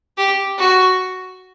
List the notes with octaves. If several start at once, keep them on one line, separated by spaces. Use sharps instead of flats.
G4
F#4